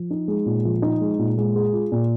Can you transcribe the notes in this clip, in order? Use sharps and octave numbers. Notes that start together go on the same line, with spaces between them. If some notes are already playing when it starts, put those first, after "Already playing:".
Already playing: F3
D#4
G#3
A#2
F3
D#4
G#3
A#2
G#3
G#4
F4
A#2